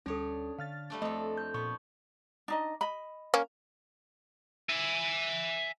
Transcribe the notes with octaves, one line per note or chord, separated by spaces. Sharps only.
D2 G3 C#4 D4 A4 C#5
D3 F5 F6 A6
G3 A3 D4
F2 A3 A4 D#5
G6
A#2 B3 C#6
D4 D#4 D#5
D#5 B5
A#3 C#4
E5 G#5